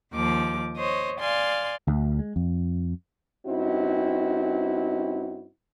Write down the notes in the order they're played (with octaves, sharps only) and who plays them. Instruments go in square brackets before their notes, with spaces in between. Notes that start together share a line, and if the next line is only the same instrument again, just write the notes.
[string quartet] D#2 F3 D6
C5 C#5 D#5
D5 F5 G#5 C6
[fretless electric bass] D2
G#3
F2
[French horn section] G2 C4 C#4 D#4 E4 F#4